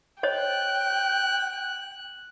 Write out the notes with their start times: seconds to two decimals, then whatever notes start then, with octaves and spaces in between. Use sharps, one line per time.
0.23 C5 C#5 D#5 G5 F#6